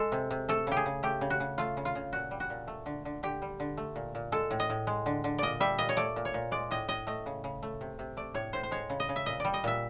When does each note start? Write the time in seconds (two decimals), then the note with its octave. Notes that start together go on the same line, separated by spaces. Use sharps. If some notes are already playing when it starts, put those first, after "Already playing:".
Already playing: G#3 A4
0.12 C3
0.31 C3
0.49 A3 A4
0.67 C#3 G4
0.77 G#4
0.86 C#3
1.03 A3 G4
1.21 C#3
1.30 F#4
1.40 C#3
1.58 A3 F4
1.77 C#3
1.85 F4
1.95 C#3
2.13 A#2 F#4
2.31 G3
2.40 F#4
2.50 A#2
2.68 A3
2.86 D3
3.05 D3
3.23 D3 G4
3.42 G3
3.60 D3
3.77 A3
3.96 A#2
4.15 A#2
4.32 G#3 A4
4.51 A2
4.60 D#5
4.70 A2
4.87 G#3
5.06 D3
5.24 D3
5.38 A#2 D5 D#5
5.60 G3 E5
5.78 A#2 D#5
5.89 C#5
5.97 A3 D5
6.16 A#2
6.25 C#5
6.34 A#2
6.51 G#3 D5
6.71 A2 D#5
6.88 A2 D#5
7.07 A3 D#5
7.26 C#3
7.44 C#3
7.63 A3
7.81 C3
7.99 C3
8.17 A3 D5
8.34 A2 C#5
8.53 A2 C5
8.63 C5
8.71 G#3 C#5
8.90 C#3
9.00 D#5
9.09 C#3
9.16 E5
9.26 A#2 D#5
9.40 G3 D5
9.54 D#5
9.64 A#2 E5